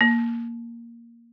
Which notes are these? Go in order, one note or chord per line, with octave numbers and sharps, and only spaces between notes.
A#3